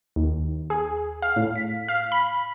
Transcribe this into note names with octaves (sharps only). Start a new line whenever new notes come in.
D#2
G#4
F5
A2
B6
F5
B5